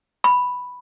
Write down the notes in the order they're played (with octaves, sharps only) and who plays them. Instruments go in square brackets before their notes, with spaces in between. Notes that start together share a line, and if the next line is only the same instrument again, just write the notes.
[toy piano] B5